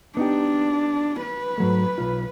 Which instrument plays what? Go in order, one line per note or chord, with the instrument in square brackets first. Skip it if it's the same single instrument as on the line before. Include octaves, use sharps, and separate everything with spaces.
[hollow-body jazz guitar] B3 D#4 G4 [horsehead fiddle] D4
[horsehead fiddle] B4
[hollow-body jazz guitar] G#2 F#3 A3
B1 F4